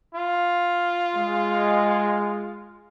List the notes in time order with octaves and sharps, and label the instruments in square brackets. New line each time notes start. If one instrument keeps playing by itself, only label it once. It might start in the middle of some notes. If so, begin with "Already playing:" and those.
[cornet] F4
[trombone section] G#3